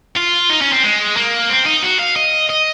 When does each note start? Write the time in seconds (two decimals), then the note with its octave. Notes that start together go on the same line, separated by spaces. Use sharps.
0.17 F4
0.50 D#4
0.61 C#4
0.72 C4
0.83 G#3
1.16 A#3
1.50 C4
1.66 D#4
1.83 F#4
1.99 F5
2.16 D#5
2.49 D#5